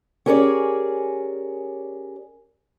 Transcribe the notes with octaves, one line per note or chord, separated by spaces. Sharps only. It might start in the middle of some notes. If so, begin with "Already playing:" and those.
C#4 G4 G#4 A#4 C#5 D5